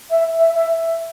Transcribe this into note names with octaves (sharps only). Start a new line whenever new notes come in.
E5
E5
E5